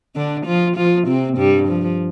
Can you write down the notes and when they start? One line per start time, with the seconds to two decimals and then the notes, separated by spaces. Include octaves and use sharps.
0.16 D3 D4
0.46 F3 F4
0.76 F3 F4
1.08 C3 C4
1.38 G2 G3
1.68 F3